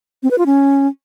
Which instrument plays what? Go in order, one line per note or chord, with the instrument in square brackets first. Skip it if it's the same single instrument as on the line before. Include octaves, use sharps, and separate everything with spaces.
[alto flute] C4
B4
F4
C#4